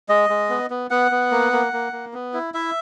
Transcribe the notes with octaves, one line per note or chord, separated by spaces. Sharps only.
G#3 D#5
G#3
B3
B3
B3 F#5
B3
A#3
A#3
A#3
A#3
B3
E4
E4 E5